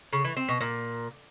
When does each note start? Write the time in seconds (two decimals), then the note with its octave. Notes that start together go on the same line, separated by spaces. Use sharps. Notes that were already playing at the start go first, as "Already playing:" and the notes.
0.13 C#3
0.25 E3
0.37 C4
0.49 B2
0.61 A#2